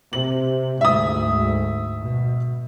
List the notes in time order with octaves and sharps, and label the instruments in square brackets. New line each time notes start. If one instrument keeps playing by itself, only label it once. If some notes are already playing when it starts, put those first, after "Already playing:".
[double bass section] C3 [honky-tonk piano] F#7
[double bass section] D2 G#2 [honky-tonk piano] E5 D#6
[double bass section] B2